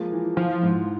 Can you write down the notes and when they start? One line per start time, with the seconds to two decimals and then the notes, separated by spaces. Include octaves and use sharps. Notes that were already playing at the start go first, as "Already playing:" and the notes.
Already playing: F3 G#3 A#3
0.12 E3
0.37 E3 F3
0.63 G#2